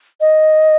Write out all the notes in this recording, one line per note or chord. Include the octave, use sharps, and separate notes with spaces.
D#5